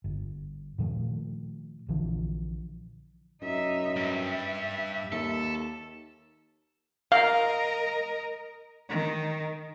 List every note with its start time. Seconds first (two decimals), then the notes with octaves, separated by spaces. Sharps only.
0.04 G1
0.78 A#2 D#3 F3 A3
1.88 A#1 D3 E3 F3
3.42 F#2 D#4 E5
3.96 G2 E5
5.12 D#2 A4
7.12 A#4 D#5 F5
8.89 D#3